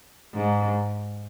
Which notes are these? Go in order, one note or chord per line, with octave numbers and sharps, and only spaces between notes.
G#2